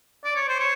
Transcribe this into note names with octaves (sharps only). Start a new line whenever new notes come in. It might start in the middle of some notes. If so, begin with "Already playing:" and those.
D5
C#5
C5
C#5